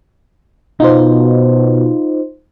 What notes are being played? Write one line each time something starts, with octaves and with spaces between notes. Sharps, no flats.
B2 D#4 F4 C5